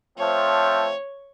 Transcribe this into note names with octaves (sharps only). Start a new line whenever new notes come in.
F3 A3 C4 C#5